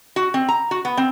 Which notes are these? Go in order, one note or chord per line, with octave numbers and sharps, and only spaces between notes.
F#4
C4
A#5
F#4
B3
C4